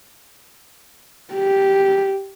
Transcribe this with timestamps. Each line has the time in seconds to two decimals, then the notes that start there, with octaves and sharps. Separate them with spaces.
1.34 G4